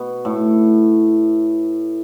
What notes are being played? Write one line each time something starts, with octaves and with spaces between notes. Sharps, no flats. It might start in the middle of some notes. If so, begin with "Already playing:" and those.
Already playing: B2
A2